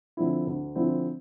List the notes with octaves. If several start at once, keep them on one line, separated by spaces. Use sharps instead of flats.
D3 F3 C4 E4
D2
D3 F3 C4 E4